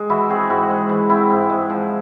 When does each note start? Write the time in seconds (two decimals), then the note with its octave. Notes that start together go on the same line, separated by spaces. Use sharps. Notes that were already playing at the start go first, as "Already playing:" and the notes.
Already playing: G#3
0.10 E3 E4 F#4
0.30 C4 F#4 G#4
0.49 G#2 E4 F#4
0.70 G#3
0.89 E3
1.09 C4 E4
1.30 G#2
1.50 G#3
1.70 F3